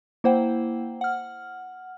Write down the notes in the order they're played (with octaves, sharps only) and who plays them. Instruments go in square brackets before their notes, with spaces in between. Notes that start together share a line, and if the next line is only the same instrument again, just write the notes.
[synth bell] A#3 E4 C5 F#5 G5
F#5 F6